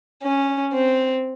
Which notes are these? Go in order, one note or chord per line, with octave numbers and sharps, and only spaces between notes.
C#4
C4